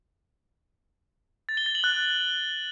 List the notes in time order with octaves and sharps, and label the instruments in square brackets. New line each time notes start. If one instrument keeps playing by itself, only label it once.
[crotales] A6
G7
A6
F#7
F#6